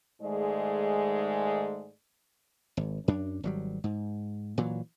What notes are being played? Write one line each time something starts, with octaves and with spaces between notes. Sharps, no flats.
G#2 D#3 G#3 A3 G#4 D5
G#1
F#2 D4
G#1 F#3 G3
G#2
A#2 E3 F#3